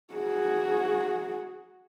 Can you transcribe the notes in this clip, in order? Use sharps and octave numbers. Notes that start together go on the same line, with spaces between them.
F#4 G#4